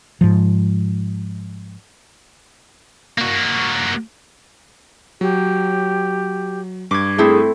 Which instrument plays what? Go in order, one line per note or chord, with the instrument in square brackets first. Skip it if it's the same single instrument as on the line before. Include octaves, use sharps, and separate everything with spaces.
[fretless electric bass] G#2 F3
[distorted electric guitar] A#3 F#4
[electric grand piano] F#3 [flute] G4
[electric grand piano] G2 [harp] D6 G#6
[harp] A3 C4 E4 [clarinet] G#4